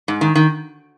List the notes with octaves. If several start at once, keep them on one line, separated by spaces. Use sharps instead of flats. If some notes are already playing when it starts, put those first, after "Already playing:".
G#2
D#3
D#3